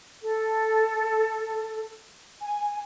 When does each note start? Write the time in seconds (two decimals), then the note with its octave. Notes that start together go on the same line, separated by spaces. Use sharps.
0.22 A4
2.39 G#5